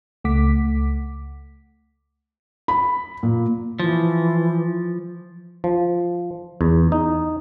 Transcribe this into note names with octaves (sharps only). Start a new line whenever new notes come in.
C#2 A3 F#5 D6 B6
B5
A#2
E3 F3
F3
E2
D#4